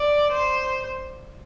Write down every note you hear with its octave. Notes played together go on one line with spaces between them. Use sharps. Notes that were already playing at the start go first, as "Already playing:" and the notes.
Already playing: D5
C5